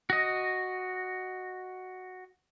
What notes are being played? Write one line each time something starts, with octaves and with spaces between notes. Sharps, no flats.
F#4 D#5